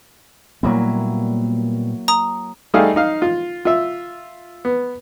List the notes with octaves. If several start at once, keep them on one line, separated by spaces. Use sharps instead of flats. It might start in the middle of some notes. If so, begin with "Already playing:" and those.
A#2 F#3 G3 A#3 B3 E4
A#5 D#6
G3 A3 D#4 G#4 F5
D#4 F5
F4
F4 E5
B3